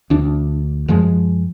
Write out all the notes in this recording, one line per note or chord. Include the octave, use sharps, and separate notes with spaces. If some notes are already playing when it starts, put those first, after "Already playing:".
D2 D4
F#2 F3 G#3